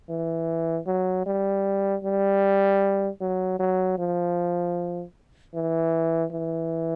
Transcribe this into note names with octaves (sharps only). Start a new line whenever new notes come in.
E3
F#3
G3
G3
F#3
F#3
F3
E3
E3